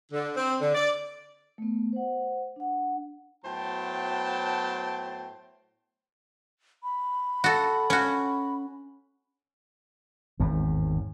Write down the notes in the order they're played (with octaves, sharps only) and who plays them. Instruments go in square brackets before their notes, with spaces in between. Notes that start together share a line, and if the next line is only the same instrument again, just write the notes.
[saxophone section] D3
C4
D3
D5
[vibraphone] A3 B3
C5 F#5
D4 F#5
[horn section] A2 F#3 B3 C5 G5 A5
[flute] B5
[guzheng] F#4 A4
C#4 F#4
[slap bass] G#1 E2 A2